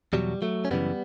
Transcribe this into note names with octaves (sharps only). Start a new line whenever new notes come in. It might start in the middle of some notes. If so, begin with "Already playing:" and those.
E2 B2 F#3 G3
F#3 A3
C#4
F#2 C#3 E3 G3 B3